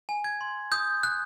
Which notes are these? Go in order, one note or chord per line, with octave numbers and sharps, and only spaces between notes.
G#5
G#6
C6
D#6 G6
F#6